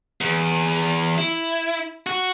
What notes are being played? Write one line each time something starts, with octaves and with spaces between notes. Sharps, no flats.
E2
E4
F#4